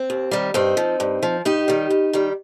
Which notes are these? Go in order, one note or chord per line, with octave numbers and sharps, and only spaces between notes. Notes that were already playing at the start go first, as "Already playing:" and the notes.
Already playing: C4
D#2
D#3 G3
G2 C4 D#4
F3
G2
F3
G2 D#4 G4
D#3 G3
G2
D#3 G3